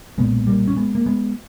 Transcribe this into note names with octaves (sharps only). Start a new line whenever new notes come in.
B1 A#2 G#3 B3
G3 A#3
C#4
G#3 B3
A#3
G#3 B3